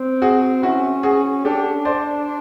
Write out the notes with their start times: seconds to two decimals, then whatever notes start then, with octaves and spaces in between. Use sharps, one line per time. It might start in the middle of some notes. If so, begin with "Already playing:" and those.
Already playing: C4
0.22 F#4 G#4
0.62 C#4 E4 F#4
1.03 F#4 G#4
1.45 D4 G4 A4
1.85 C5 D5